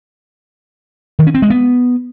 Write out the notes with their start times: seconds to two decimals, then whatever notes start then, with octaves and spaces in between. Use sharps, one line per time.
1.19 D#3
1.27 C#4
1.34 C4
1.42 G#3
1.50 B3